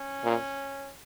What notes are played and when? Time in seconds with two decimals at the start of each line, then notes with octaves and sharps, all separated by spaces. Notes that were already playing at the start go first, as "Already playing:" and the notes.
Already playing: C#4
0.24 A#2